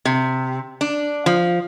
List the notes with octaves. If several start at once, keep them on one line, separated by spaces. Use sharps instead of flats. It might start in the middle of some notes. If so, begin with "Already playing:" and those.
C3
D4
F3